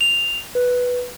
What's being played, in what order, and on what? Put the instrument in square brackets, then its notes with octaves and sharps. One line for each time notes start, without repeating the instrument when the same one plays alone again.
[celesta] F7
B4